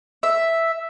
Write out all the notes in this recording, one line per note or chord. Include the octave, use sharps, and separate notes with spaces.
E5